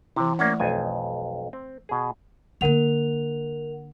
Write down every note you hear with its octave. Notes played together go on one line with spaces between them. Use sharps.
C3 E3 E4
A3 A#3 C#4 D5 F#5
B1 F2 G#5
C4
B2 G#4
D3 A#3 A#4 F#5 F7